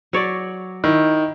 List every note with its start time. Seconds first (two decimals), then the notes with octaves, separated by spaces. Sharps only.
0.13 F#3 C#5 D5
0.84 D#3 E4